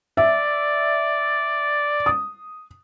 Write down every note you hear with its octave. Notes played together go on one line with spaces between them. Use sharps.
D5 E5
D#6